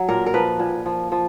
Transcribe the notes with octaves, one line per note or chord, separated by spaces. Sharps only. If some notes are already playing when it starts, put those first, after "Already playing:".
Already playing: F#3
A#2 A#4
A#4
F3 B4
A#2
F3
F3